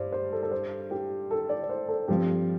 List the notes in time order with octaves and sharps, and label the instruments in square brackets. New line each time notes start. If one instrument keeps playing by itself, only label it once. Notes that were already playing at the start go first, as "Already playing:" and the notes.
Already playing: [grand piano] G2 [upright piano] C5 D5
[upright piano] C5
A4
A4
C5
G4
A4
D5
D5
C5
A4
[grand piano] G2 F3 C4 [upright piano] G4